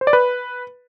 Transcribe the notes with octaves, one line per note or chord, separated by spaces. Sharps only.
C5
D5
B4